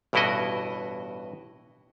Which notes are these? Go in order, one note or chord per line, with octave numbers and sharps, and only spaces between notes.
A1 G2 B2 E4 F#4 D#5